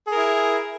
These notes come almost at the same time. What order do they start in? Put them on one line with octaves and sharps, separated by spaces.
G#4 A#4 E4